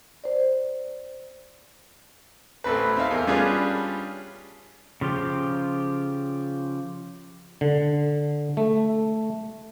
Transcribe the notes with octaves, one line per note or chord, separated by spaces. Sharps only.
C5 D5
A1 A3 C4 B4
C4 D#4 E5 F5
E2 A#4
G3 C#4 D4 F4 G#4 B4
C#3 F3 F4 G4
D3
A3